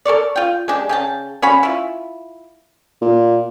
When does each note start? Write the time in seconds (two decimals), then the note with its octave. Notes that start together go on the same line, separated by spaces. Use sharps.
0.05 A4 A#4 C#5 D5
0.36 F4 G5
0.68 G#3 D4 G4
0.89 C#3 G5 A5
1.42 C#4 F#4 B5
1.63 E4 F4
3.01 A#2